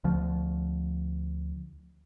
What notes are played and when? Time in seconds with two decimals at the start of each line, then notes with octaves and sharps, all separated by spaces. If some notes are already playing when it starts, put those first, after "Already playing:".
0.04 D2 F3